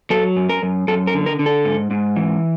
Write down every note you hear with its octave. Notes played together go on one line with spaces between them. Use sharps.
F#3 A4
F#2
A#4
F#2
F#2 A4
A#4
D3
A#4
D3
A4
G#2
G#2
E3